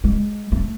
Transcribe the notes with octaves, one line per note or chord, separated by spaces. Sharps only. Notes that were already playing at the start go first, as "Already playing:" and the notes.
G#3
A3